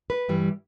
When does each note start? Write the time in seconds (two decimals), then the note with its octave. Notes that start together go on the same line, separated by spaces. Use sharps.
0.10 B4
0.29 G2 E3 G3